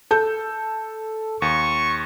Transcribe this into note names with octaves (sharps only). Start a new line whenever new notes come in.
A4 G6
D#2 C#6